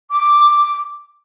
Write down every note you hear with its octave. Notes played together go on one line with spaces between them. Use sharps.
D6